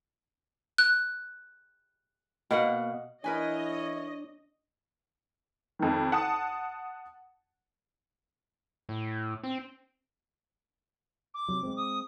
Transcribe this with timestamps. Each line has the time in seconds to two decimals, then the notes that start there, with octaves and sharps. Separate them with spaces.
0.78 F#6
2.51 B2 A#3 F#5
3.24 E3 D4 E4 A#4 B4 C#5 D#5 G#5
5.79 F2 D#3
6.12 F#5 A5 D#6
8.89 A2
9.43 C4
11.34 D6
11.48 C3 F#3
11.63 G#3 A3 C4
11.77 D#6